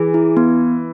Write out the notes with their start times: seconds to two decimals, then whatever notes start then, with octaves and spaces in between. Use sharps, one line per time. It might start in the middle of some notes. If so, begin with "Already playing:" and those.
Already playing: E3 G#4
0.14 E4
0.37 B3